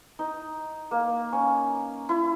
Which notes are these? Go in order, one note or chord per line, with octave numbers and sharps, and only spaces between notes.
D#4
A#3
C#4
E4